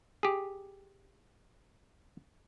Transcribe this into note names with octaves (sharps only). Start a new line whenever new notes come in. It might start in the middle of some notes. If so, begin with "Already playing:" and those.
G4 G#4